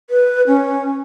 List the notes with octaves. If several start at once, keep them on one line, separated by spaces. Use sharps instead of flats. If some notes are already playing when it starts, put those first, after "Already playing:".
B4
C#4